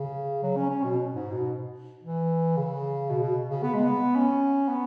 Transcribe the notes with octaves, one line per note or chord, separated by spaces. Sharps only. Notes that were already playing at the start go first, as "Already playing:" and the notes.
Already playing: C#3
F#3
C#4
C#4
B2
G#2
B2
E3
C#3
B2
B2
C#3
B3
G#3
B3
C#4
B3